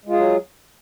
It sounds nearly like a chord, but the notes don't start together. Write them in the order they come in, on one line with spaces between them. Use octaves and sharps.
G#3 F4 G#4 F#3